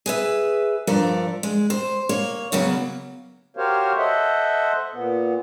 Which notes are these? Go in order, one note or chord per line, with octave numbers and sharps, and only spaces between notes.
G#4 B4 E5
G2 F3 A4 A#4 D5
G#3
C5
A#3 C#5
C#3 F#3 A#3 B3
F#4 G4 A#4 C5 C#5 F5
A4 C5 D#5 E5 F#5
A#2 B3